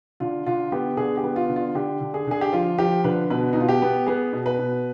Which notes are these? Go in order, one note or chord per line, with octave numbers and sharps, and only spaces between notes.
D3 F4
D3 F4
B3 G4
D3 G#4
G4
B3
F4
D3
F4
D3 G4
D3
G#4
D3 G#4
G4
F3 F4
F3 G4
D3 B4
B2 B4
D#4
B2 F4
G4
B3
B3 G#4
B2
B4
B2